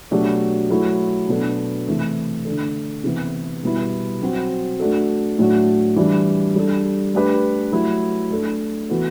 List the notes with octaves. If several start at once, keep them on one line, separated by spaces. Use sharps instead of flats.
B2 F#3 A3 D4 G4
F#3 A3 E4 A4
B2 F#3 B3 D4 A4
C3 E3 A3
D3 A3 D4 A4
C3 E3 B3
B2 G3 B3 E4
F#3 C4 F#4
A3 D4 F#4 A4
A2 F#3 A3 D4 F#4
E3 G3 D4
G3 D4 A4
A3 D4 G4 B4
F#3 A3 E4
A3 D4 A4
E3 B3 F#4 A4